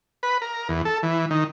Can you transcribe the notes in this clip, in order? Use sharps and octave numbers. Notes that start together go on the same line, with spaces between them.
B4
A#4
E2
A4
E3
D#3